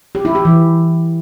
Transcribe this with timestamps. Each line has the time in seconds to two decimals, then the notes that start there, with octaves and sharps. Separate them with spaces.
0.15 G4
0.25 E4
0.35 G4
0.45 E3